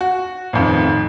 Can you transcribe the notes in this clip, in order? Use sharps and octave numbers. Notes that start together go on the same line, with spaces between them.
F#4
A1 F2 D#3